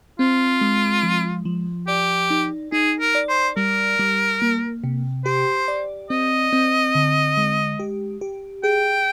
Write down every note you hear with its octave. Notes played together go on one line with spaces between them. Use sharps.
C4 F4
G#3
F3
F3
G4 D5
D#4
D#4 G#4
A#4
D5
C5
G3 A#4
G3
A#3
C3
G4 C5
D5
C4 D#5
C4
D3
G#3
G4
G4
G#4 G5